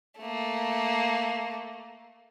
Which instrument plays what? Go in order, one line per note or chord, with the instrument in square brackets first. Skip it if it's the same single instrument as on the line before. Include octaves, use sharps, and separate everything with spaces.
[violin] A3 A#3